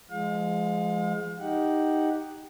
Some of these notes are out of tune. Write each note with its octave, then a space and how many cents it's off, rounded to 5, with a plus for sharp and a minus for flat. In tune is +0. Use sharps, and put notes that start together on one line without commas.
F3 -30 G#3 +0 F5 +35
D#4 +0 G4 +0 F#5 +0